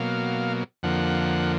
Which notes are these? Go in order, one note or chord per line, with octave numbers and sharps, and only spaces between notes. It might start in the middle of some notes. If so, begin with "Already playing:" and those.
Already playing: B2 F#3 A#3 F5
F2 D3 F3 A#3 F#5